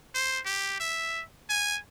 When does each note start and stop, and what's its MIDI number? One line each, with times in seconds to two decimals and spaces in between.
0.15 0.40 72
0.46 0.77 67
0.80 1.23 76
1.50 1.78 80